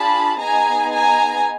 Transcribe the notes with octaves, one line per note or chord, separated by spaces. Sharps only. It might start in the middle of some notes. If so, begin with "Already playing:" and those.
Already playing: D4 F4 G#4 A5 B5
B3 D#4 G#4 G#5 A#5
G#5 A#5